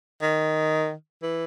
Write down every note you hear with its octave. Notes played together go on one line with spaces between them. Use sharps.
D#3
E3